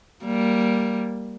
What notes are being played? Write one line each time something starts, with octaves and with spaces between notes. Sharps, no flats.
G3 A#3